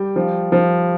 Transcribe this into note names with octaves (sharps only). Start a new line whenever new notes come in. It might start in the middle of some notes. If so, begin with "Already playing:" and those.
Already playing: G3 G5
F3
F3